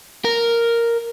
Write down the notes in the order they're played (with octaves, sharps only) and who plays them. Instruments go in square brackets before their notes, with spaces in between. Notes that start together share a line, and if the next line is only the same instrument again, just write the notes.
[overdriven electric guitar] A#4